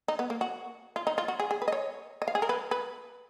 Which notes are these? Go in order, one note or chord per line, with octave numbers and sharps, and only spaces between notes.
D#4
B3
A#3
F#4
F4
D#4
F4
F#4
G#4
G#4
B4
D#5
C#5
D#5
F5
G#4
A#4
B4
B4